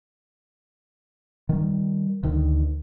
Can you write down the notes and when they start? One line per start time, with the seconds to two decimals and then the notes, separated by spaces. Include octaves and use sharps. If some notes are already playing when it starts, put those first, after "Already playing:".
1.49 D#3 G3
2.23 D2 D#3